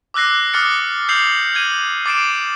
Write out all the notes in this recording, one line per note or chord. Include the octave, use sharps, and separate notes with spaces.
D6 E6 F#6 A#6 C7
D6 D#6 F6 F#6 A6 C#7
E6 G6 C7 F7 F#7
F6 G#6 D#7
D6 A6 C7 D7 E7